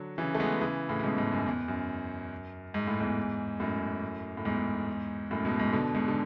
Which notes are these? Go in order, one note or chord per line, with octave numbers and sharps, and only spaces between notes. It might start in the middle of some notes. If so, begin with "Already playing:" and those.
Already playing: D3 F#3
C#3 E3
A3
G#3 B3
C#3 E3
A2 C#3
C#3
G#2 B2
G#2 B2
F#2
E2
F#2
G#2
A2
E2 G#2
F#2 A2
A2
E2 G#2
F#2 A2
G#2 B2
G#2 B2
B2 D3
G#2 B2
D3